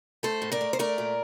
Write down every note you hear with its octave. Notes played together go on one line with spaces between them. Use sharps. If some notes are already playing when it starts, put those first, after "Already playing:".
A3 A4 C5
A2
A#4 D5
A3
C5
A3 A#4 D5
A#2